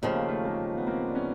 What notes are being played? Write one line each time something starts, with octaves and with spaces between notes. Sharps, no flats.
D#2 C#3 F3 A3
A#3
A3
G#3 A#3
B3
A#3 C4
D4
B3 C#4